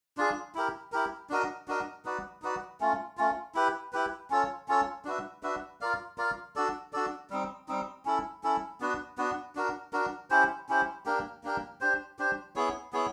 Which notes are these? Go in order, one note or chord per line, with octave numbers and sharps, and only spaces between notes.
D4 F4 G#4
E4 G4 A#4
E4 G4 A#4
D4 F#4 A#4 D#5
D4 F#4 A#4 D#5
D#4 F#4 B4 D5
D#4 F#4 B4 D5
A3 C#4 F4
A3 C#4 F4
E4 G4 B4
E4 G4 B4
C#4 F4 A4 C#5
C#4 F4 A4 C#5
D4 F#4 B4 E5
D4 F#4 B4 E5
F4 A#4 D5 F5
F4 A#4 D5 F5
D4 F#4 A4 D5
D4 F#4 A4 D5
G3 C4 D#4
G3 C4 D#4
C#4 E4 A4
C#4 E4 A4
B3 D4 F#4 B4
B3 D4 F#4 B4
D4 F#4 A#4
D4 F#4 A#4
C#4 E4 G4 C5
C#4 E4 G4 C5
A#3 D4 G4 A#4
A#3 D4 G4 A#4
D4 G4 C5
D4 G4 C5
B3 E4 G#4 C#5
B3 E4 G#4 C#5